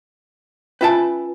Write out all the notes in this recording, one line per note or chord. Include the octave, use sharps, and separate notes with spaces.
C#4 F4 B4 E5 G#5 A5